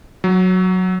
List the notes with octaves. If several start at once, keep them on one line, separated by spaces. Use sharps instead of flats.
F#3